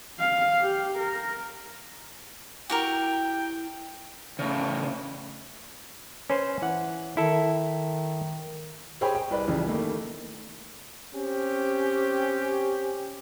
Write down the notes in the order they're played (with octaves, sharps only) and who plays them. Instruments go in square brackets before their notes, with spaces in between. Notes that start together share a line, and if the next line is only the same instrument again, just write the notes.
[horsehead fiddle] F5
G4
A#4
[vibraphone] E4 [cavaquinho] F#4 G4 A#4 [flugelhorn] G5
[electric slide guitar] A2 C#3
[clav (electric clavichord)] C#4 B4 C5
E3 F#5
[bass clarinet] D#3 [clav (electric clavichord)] E4 A4
[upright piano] G4 G#4 C5 C#5 G5 B5
G5
C2 B4 D5
C2 F2 C#3 E3
D#3 A3 A#3
[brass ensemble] C4 C#4 G4